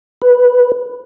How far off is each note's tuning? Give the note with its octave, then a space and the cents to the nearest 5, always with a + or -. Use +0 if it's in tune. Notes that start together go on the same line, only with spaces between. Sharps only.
B4 -5